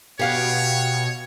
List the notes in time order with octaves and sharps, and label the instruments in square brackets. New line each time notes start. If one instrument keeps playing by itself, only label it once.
[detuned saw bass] B2 [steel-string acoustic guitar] G4 F5 F#5 [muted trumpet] C#5